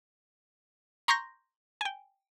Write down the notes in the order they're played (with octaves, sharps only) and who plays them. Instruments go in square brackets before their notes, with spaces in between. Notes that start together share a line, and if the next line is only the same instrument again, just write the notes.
[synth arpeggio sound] A#5 C6 C#6 G6 A#6
G5 G#5